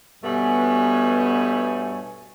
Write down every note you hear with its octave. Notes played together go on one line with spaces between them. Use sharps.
G2 B2 A3 B3 C#5 G#5